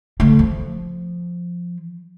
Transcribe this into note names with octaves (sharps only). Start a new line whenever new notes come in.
D3 A3
F3